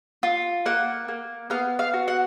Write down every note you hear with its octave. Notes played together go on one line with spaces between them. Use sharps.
F4
A#3 F#5
A#3
B3 F5
F5
F#4
F#5